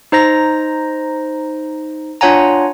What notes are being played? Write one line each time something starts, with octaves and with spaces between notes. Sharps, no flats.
D#4 C5 A#5 A#6
D4 F4 C#5 F#5 G#5 A#5